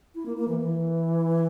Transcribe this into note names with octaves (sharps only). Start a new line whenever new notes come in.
E4
A#3
A#3
E3
E3